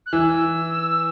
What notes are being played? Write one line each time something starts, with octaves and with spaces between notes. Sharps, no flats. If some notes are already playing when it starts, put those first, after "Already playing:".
F#6
E3 E6